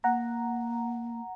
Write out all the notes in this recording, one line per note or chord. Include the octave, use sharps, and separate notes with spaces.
A#3 F#5 A#5